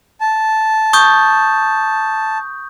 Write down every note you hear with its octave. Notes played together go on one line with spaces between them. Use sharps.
A5
C#6 D#6 G6